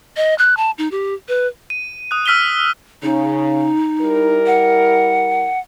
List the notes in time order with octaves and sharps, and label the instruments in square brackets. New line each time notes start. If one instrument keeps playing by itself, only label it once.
[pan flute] D#5
F#6
A5
D#4
G4
B4
[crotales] D#7
D#6 F#6
E6 F6 B6 D#7 G7
[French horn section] C#3 [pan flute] D#4
[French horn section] G3 E4 A#4
[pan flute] F#5